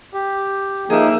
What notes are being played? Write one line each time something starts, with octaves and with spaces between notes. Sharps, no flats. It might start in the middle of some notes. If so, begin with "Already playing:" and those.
G4
F3 A#3 D#4 G#4 E5